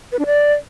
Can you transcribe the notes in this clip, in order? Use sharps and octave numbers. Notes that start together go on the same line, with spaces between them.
B4
D4
D5